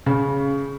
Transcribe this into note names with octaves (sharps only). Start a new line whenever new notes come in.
C#3